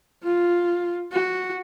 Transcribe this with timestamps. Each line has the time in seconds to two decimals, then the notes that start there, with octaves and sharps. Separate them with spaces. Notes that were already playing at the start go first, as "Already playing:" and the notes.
0.24 F4
1.12 F#4